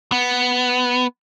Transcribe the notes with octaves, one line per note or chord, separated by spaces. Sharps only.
B3